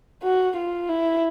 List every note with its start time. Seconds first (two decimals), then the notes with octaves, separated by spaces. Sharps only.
0.23 F#4
0.57 F4
0.89 E4